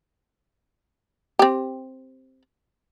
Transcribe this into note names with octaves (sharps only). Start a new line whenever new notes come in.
C4 G4